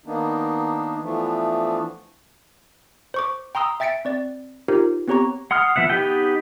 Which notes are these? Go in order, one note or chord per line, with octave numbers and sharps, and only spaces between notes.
D#3 A#3 B3 D4 D#4
E3 F3 A3 B3 D4
C5 C#6 D6
G5 A#5 C6 D#6 E6
E5 G5 A6 B6 C#7 D7
C4 D5 A6
D#4 F4 G4 A#4 C5
B3 C4 G4 C#5 A#5 C#6
F#5 C6 D#6 F6
F3 B3 E5 F#5
B3 D#4 G4 B4 G5